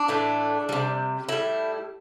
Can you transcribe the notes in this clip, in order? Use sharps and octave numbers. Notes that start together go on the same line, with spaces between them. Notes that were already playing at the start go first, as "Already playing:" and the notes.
Already playing: D4
A2 E3 A3
C3 G3
A2 G3 E4